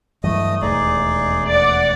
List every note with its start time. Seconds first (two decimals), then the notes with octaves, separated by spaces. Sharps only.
0.24 G2 E3 F#3 A3 D#5 D#6
0.62 E1 D#2 A3 D#4 G#4 D5
1.48 D5 F#5